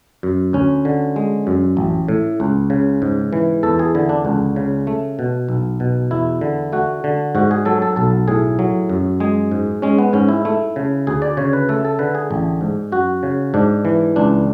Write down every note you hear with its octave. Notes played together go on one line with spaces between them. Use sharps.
F#2
D2 C#4
D3
G#3
F#2
A1
A2
C#2
C#3
G#2
E3
E2 A4
G#4
D3 E4
D4
C#2
C#3
A3
B2
B1
B2
E2 E4
D3
A3 F#4
D3
G#2 F#4
G#4
F#3 A4
A4
B1 A4
A2 G#4
F#3
F#2
G#3 G#4
G#2
G#3 C#4
B3
G#2 C#4
E4
A3 E4
C#3
D2 G#4
D5
C#3 C#5
B4
A3 A4
A4
D3 B4
G#4
A1
G#2
F#2 F#4
C#3
G#2 D4
E3
C#2 D4